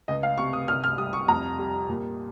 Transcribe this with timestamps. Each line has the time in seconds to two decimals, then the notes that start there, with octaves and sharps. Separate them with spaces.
0.08 C#2 D#5
0.23 F5
0.38 C3 C#6
0.53 D#6
0.68 C2 F6
0.84 F6
0.98 G3 D#6
1.13 C#6
1.28 F2 A#5
1.59 G3
1.89 A#2